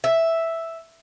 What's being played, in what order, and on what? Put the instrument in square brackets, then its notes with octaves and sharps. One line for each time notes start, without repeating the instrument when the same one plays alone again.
[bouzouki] E5